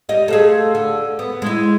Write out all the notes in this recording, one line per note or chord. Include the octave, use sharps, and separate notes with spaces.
G3 D#5
A3 F4 G#4
D3
B3
G#3 E4